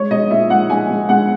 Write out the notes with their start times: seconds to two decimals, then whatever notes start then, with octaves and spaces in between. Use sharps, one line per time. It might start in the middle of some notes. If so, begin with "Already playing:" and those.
Already playing: G#3 C#5
0.11 G#3 D#5
0.31 A#2 E5
0.50 G#3 F#5
0.69 G#3 G#5
0.89 G#3
1.09 G#3 F#5